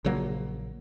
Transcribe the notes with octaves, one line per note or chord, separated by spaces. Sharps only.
A#1 C#3 F#3 A#3